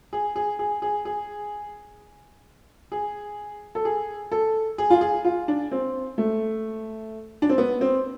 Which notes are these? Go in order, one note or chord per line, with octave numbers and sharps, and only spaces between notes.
G#4
G#4
G#4
G#4
G#4
G#4
A4
G#4
A4
G#4
F4
G#4
F4
D4
C4
A3
D4
C4
B3
C4